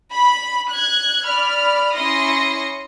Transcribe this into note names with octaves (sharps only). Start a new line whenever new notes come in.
B5
F#6 G#6
D5 B5 F6
C#4 E4 C6 D#6 A#6 C#7